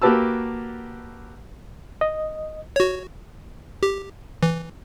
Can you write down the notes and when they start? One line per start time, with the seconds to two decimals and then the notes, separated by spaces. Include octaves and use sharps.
0.02 A#3 F#4 G4 B4 A5 E6
2.01 D#5
2.76 F#4 C#5
3.83 G4
4.43 E3